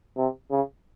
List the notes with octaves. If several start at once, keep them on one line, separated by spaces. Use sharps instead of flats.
C3
C#3